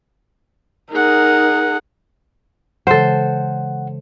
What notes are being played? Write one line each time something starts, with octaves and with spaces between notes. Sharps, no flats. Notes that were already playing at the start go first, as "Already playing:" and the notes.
D#4 G#4 A#4 F#5
C#3 E3 G#3 A4 C5 F#5